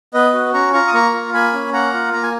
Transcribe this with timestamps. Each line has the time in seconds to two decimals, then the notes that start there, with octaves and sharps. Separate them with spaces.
0.14 B3 B4 D#5
0.33 F#4
0.54 C#4 A#5 C#6
0.73 F4 A#5 C#6
0.87 D#6
0.94 A#3 A#5 C#6
1.14 F4
1.33 A#3 G#5 B5
1.53 C#4
1.73 A#3 F#5 A#5
1.93 F4
2.13 A#3 A#5
2.23 G#5